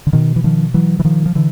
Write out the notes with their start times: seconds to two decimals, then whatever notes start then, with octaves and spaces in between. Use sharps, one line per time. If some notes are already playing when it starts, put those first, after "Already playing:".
0.07 D3
0.13 B2 D#3
0.36 E3
0.44 D#3 F3
0.74 E3 F#3
0.99 E3
1.05 D#3 F3
1.26 F3
1.35 D3 E3